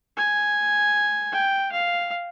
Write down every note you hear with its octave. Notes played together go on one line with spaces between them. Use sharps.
G#5
G5
F5